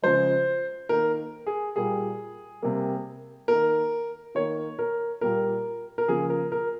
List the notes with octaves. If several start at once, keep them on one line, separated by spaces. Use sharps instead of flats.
C#3 F3 G#3 C5
D#3 A#3 A#4
G#4
A#2 G3 A#3 G#4
C3 G3 A#3
D#3 A#3 A#4
D#3 A#3 C#5
A#4
A#2 G3 A#3 A#4
A#4
C#3 F3 A#3 G#4
A#4
A#4